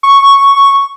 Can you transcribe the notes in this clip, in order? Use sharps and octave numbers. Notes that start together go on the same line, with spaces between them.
C#6